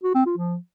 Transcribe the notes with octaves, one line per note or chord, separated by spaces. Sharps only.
F#4
C4
F4
F3